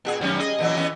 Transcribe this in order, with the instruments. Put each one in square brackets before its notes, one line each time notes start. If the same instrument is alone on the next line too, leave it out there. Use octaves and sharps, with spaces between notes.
[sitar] A#2 G4 G#4
[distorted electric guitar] F#2 D#3 [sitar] G3 C#4
[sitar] G#4 [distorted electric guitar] D#5
[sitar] A#2 E3 F#3
E3 B3 C#4